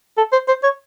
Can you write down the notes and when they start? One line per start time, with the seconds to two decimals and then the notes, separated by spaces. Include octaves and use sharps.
0.18 A4
0.32 C5
0.48 C5
0.64 C#5